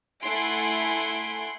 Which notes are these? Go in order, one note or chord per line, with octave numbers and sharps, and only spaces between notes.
A3 E4 F#5 G#5 C6 D7